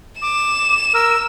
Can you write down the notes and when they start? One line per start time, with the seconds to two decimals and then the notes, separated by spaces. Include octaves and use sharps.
0.22 D6 E7
0.94 A#4 E6